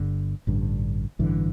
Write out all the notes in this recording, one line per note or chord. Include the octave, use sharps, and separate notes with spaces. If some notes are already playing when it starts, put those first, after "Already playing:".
Already playing: G1 G2 D3
A1 G2 D3
A1 G2 D3 E3